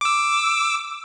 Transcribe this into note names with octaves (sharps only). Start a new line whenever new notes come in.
D6 E6